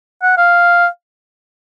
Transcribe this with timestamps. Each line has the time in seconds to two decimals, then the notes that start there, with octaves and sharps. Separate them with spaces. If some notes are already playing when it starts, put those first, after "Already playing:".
0.22 F#5
0.37 F5